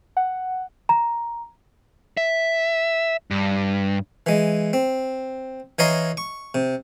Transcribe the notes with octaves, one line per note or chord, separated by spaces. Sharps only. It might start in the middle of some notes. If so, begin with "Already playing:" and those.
F#5
A#5
E5
G2
E3 G#3
C4
E3 C#5 D#5 F5 A#5 C6
C#6
C3